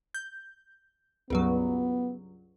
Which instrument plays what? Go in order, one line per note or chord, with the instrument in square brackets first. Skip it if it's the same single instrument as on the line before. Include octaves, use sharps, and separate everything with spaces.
[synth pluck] G6
[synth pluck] C#2 G2 F#3 [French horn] B3